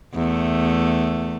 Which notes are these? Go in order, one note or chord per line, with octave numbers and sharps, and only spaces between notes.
E2 A3